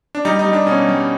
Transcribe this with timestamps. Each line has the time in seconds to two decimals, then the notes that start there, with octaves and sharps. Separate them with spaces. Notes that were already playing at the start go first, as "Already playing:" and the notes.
0.15 D4
0.25 G3 D#4
0.39 D#4
0.46 G3
0.53 D4
0.67 B2 C#4
0.89 G3